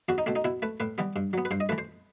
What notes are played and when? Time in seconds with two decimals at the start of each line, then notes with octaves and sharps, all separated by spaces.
0.09 E2 F#4
0.18 D#4
0.26 B2 A3 C4
0.36 D#4
0.44 B2 E4
0.62 A3 B4
0.80 A2 B4
0.98 E3 G3 B3
1.16 G2
1.33 F#3 B3
1.45 B4
1.51 G2 C5
1.60 D#5
1.69 E3 A3 B4
1.78 C5